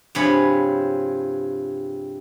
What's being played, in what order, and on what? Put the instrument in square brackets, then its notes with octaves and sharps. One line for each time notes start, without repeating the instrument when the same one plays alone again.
[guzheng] G2 C3 F3 G#4 C#5 B5